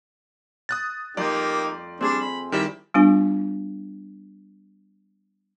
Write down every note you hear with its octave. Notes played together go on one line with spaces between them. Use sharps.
D#6 F#6 A6
F2 A#3 D#4 G4 D5 G6
G3 C4 D4 G#4
B5
D#3 G3 E4 G4 E5
G3 B3 D4 F4 G#5